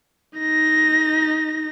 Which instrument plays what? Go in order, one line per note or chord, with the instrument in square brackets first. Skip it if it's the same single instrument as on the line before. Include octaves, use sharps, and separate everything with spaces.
[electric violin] D#4 A#6